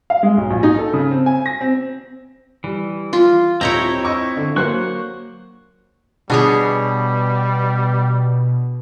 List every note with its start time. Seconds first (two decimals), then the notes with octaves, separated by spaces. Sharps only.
0.10 F5
0.23 G#3
0.37 B1
0.50 A#1
0.63 D#4
0.79 A4
0.93 C#3
1.11 C4
1.26 G#5
1.46 A#6
1.61 C4
2.64 E3 G3
3.13 F4
3.61 D#1 C4 E4 C#5 D#5 G5 A#5
4.04 D#5 C#6 E6
4.37 D3
4.56 F#3 A#3 C5 C#6 F#6
6.30 B2 G3 D4 G#4 C#5